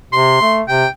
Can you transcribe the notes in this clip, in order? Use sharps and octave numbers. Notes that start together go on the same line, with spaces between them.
C3 C6
A3
C3 G5